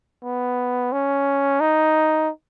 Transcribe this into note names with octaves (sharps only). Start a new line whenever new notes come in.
B3
C#4
D#4